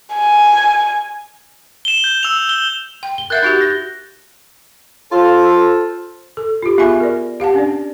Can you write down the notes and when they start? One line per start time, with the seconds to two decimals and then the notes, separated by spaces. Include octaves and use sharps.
0.14 G#5
1.85 E7 G7
2.04 G6
2.23 E6 F7
2.49 G7
3.03 G5
3.18 G7
3.30 A#4 E5 F#5 F#6 G6 A6
3.42 D#4 F#4 G4
3.61 A#6 G7
5.11 F4 A4 C5
6.37 A4
6.62 F4 G4
6.78 B3 F4 G#4 E5 G#5 C#6
7.00 A#4 D5
7.40 G4 F5 F#5 A5
7.54 C#4 D4 D5